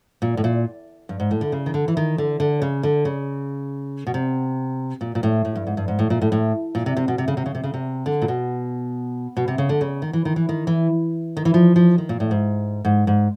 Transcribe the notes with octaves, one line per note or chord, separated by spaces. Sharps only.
A#2
A2
A#2
G2
G#2
A2
D3
C#3
D#3
D3
E3
D#3
D3
D3
C#3
D3
C#3
B2
C3
A#2
A#2
A2
A2
G2
G#2
G2
G#2
A2
A#2
A2
A2
A#2
C3
C3
B2
C3
C#3
C3
C#3
C3
C#3
C3
D3
A#2
B2
B2
C3
C#3
D3
C#3
D#3
E3
D#3
E3
D#3
E3
D#3
E3
F3
F3
D#3
A#2
A2
G#2
G#2
G#2